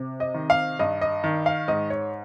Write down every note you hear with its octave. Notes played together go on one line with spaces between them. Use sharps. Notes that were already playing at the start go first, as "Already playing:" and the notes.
Already playing: C3
D#5
D#3
F5
G2 D#5
D#5
D#3
F5
G#2 D#5
C#5